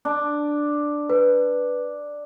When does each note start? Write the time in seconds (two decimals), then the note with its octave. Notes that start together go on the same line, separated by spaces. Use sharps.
0.05 D4
1.10 B4